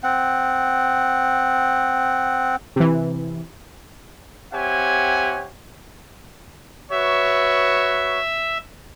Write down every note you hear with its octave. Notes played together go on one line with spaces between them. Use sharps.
C4 F#5
C3 E3
C4 G4 C#5 E5 F#5 G#5
F#4 B4 C#5 E5